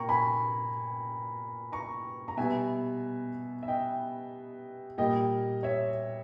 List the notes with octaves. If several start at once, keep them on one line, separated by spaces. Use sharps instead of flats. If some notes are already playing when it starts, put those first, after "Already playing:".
Already playing: A#2 A#3 G5 A#5 C#6
G#5 B5
A#5 C#6
A#5
B2 G3 B3 E5 G#5
E5
D#5 G5
A#2 G3 A#3 D#5 G5
C#5 E5